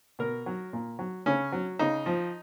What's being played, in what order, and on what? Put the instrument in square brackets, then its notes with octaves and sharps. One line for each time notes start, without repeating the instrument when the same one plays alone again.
[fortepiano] B2 A#4
F#3
A#2
F#3
C#3 C#4
F#3
C#3 D#4
F3